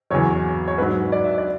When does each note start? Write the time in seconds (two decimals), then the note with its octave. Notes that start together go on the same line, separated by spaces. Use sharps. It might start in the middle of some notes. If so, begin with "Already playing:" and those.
0.10 E2 C#3 F#3 C#5
0.68 C#5
0.78 G#2 F#3 B4
1.12 D5
1.25 E5
1.38 D5